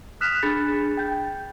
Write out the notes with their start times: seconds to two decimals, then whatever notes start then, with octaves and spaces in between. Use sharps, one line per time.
0.21 D#6 F6 F#6 B6 E7 F7
0.43 D4 G#4 B5 G6 A6 C#7
0.97 G5 G6